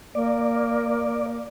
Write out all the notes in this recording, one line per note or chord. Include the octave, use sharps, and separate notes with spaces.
A#3 D5